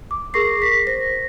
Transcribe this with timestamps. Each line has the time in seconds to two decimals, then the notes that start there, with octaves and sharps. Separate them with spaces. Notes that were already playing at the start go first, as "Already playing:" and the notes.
0.11 D6
0.34 G#4 A#4 C#6 A#6 C7
0.62 B6
0.87 C5 A#6